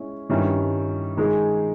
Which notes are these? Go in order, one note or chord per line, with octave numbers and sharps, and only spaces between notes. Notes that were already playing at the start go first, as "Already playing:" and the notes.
Already playing: G#3 C#4 E4
G2 D#3 G3 C#4 E4
D#3 G#3 D#4 G#4